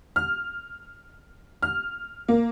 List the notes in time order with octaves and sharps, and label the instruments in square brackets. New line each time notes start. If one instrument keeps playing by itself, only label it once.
[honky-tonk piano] F6
F6
A#3